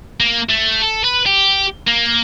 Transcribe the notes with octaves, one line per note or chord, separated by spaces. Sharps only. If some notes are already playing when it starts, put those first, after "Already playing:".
A#3
A3
A4
B4
G4
A#3